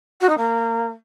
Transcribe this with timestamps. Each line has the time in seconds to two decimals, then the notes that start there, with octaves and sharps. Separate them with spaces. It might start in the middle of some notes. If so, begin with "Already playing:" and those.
0.20 F#4
0.29 D#4
0.37 A#3